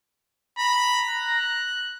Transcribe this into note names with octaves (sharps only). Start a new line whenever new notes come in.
A#5 B5
F#6